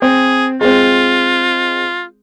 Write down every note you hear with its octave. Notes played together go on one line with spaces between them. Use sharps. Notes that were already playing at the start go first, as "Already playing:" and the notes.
C4 G#4
G#3 C4 F4